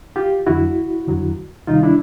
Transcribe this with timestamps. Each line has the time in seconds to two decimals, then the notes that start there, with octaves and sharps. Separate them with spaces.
0.16 F4 G4
0.46 F2 D3 F#3 E4 F#4
1.07 F2 D3 F#3
1.67 D2 C3 D#3 G3 D#4 F4
1.83 D4 E4